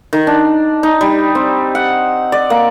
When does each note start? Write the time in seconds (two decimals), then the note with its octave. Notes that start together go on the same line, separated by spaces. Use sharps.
0.13 D#3
0.27 D4
0.83 D#4
1.01 G3
1.35 C4
1.75 F#5
2.32 D5
2.50 A#3